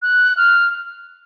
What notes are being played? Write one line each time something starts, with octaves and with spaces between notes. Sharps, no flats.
F#6
F6